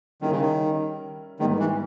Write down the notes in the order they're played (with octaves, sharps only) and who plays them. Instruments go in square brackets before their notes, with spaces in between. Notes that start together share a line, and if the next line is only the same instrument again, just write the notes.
[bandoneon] D#3 [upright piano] G3 C#4 E4 A#4
[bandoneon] C#3
D#3
[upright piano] G#2 G3 B3 [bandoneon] D#3
[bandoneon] E3